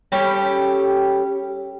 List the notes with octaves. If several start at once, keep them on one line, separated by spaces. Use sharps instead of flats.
G3 C#4 G4 A4